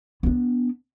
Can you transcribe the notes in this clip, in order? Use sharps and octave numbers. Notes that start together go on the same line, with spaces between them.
B3 D4